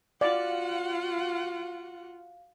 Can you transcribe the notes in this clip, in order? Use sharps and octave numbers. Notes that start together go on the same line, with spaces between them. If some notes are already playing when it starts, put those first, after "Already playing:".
F4 F#4 D5 F5 F#5